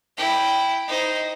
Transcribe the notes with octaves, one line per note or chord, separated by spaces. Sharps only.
E4 G5
D#4 C5